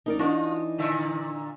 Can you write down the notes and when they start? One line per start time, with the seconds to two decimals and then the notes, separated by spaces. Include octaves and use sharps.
0.06 A1 D#4 A#4 D5
0.19 E3 D4 D#4 F4 D#5
0.78 A#2 D3 E5